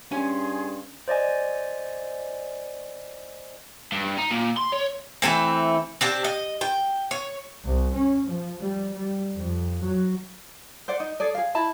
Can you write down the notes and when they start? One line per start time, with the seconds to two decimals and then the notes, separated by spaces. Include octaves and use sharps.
0.11 G2 C#4 G#4 G#5 C6
1.08 C5 D5 D#5 G#5
3.92 G2
4.18 D#4
4.31 A#2
4.57 C6
4.73 C#5
5.22 E3 A3 A#3 C4
6.01 C4 D4 G4
6.24 D#5
6.61 G5
7.11 C#5
7.66 C2
7.95 C#4
8.29 F3
8.60 G3
8.94 G3
9.35 F2
9.83 F#3
10.88 C5 D5 F#5
11.00 D#4
11.20 G#4 A4 D5
11.35 G#4 F5
11.55 E4 A5 B5